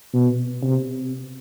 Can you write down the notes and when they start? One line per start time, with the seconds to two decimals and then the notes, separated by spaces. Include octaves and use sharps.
0.13 B2
0.62 C3